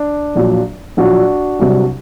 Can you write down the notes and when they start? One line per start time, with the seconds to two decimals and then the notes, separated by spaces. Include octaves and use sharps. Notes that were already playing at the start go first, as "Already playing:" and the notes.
Already playing: D4
0.35 A#1 A#2 F#3
0.97 A#1 A#2 F#3 D4 F#4
1.59 C2 C3 F#3